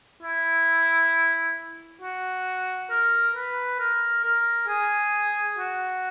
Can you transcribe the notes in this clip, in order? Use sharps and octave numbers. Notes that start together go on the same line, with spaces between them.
E4
F#4
A#4
B4
A#4
A#4
G#4
F#4